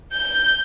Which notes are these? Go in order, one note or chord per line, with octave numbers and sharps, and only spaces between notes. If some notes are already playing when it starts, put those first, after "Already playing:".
G6